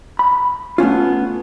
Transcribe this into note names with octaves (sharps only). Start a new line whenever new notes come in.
B5
A3 B3 C#4 F4